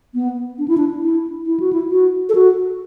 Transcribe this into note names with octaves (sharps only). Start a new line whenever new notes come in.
B3
D4
E4
D4
E4
E4
F#4
E4
F#4
A4
F#4